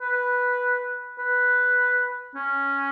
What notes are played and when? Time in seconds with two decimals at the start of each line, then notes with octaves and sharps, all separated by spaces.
0.01 B4
1.18 B4
2.35 C#4